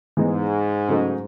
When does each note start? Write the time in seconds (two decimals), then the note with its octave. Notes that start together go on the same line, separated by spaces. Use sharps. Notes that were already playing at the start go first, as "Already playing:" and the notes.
0.17 G#2 E3 G#3 B3 D#4
0.89 C#3 F#3 A3 D#4